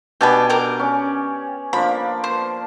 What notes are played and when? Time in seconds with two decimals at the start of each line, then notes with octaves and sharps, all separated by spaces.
0.21 B2 D4 G4 G#5 A5 B5
0.50 G4 A#4 D6
0.79 C#4 D5
1.73 F3 A#3 D4 B5
2.24 C5